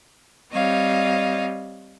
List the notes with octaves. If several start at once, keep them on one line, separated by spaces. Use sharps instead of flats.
G3 C4 C#5 D#5 F5